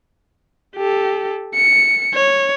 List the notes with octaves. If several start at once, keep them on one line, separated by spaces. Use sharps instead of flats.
G4 A4
C#7
C#5